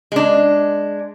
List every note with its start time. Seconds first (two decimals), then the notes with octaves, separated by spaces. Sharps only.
0.12 G#3 D4